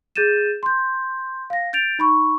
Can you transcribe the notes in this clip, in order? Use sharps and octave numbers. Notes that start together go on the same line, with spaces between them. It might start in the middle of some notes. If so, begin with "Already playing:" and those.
G#4 G6 A6 D#7 E7
C6 G6
F5 A#6
G6 A6 D7 F7
D#4 B5 C#6